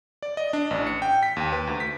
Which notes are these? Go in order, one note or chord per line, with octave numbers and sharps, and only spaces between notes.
D5
D#5
D4
A1
C#7
G5
B6
D#2
B4
D2
B6